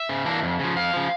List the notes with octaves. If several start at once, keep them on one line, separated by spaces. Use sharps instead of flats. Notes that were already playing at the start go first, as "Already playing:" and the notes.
Already playing: E5
C#3
E3 A#3 D4
F2
C#3 F3
F2 F5
C#3 F3